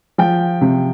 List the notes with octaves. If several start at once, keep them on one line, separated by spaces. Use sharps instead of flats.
F3 G5
C3